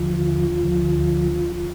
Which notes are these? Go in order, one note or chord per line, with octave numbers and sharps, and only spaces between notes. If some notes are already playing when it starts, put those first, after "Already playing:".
Already playing: D#2 D3 F3 F4
D2 D3 F3